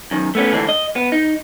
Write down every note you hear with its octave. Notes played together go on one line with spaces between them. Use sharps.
F#2 D#3
A3 B3 C#4
D3 E3 G#3 A3
D#5
B3
D#4